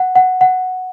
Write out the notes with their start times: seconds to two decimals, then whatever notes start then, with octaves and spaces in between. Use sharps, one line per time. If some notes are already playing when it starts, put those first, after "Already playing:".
Already playing: F#5
0.16 F#5
0.41 F#5